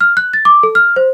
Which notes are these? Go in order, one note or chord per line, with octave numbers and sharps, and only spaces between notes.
F6
F#6
A6
D6
A4
F6
C5